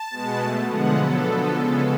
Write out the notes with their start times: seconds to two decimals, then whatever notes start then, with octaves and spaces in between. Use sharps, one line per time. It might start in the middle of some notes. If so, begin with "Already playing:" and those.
Already playing: A5
0.11 B2 G#3 B3
0.39 B2 A3
0.68 D3 F3 G#3 B3 F#5
0.97 D3 F#3 B3 A4
1.26 D3 F3 B3 A4
1.54 C#3 G#3 B3 A4